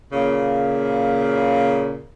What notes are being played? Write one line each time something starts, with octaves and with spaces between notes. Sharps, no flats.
A#2 C#3